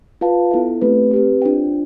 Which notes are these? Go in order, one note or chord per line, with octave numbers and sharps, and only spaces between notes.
F4 B4 F5 A5
B3 E4 A4 E5
A3 C4 G4 B4
C4 G4 B4
D4 F4 C5 G5